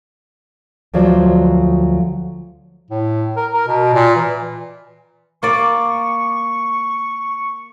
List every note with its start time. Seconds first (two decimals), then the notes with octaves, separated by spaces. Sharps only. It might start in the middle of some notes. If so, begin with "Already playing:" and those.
0.94 D2 F3 F#3 C5 D5
2.91 A2
3.37 A#4
3.53 A#4
3.68 B2
3.94 A#2
4.16 E3
5.43 A#3 D5 C#6